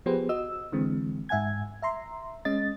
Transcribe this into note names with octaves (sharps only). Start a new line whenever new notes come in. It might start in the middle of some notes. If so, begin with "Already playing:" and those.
F3 B3 G4 G#4 B4 C5
F#4 D#5 E6
D3 E3 G#3 C4
G#2 E5 F#5 G#5 G#6
E5 A#5 C6
G#3 C#4 D#5 A6